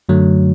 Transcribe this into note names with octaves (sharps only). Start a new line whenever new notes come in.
F#2 D3 F#3 A3